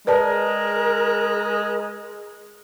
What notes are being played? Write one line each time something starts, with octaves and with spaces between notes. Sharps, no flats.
G#3 A#4 B4 D5 A5